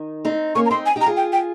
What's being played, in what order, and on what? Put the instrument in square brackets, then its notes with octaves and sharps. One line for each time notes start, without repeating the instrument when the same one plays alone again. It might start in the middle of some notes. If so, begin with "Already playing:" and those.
Already playing: [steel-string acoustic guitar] D#3
C4 D#4
[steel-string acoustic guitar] A#3 C#4 [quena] C#6
[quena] A#5
[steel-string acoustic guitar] C4 D#4 [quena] C6
[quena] G#5
[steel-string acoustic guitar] D#4 G4
[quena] A#5
[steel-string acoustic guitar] F4 G#4
[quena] G5
G5